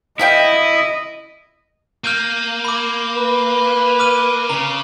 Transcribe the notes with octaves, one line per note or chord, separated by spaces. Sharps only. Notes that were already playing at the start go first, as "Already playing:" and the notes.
E4 B4 D#5 F5 G5
A#3 F6 G6 D#7
B5 D6
B4
D6 F6 D#7
C#3 A#5